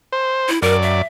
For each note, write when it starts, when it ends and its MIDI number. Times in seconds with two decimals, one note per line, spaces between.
0.12 0.51 72
0.49 0.59 64
0.62 1.02 42
0.62 0.76 70
0.62 1.02 74
0.82 1.07 76